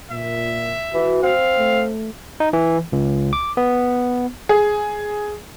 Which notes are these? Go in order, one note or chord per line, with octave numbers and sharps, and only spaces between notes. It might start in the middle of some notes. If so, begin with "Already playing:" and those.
A#2 E5
E3 F#4
C4 F5
A3
D#4
E3
C#2
D6
B3
G#4